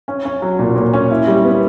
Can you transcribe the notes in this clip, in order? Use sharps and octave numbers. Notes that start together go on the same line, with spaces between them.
C#4
C#4
F#3
A#2
A#2
C#4
E4
G3
B3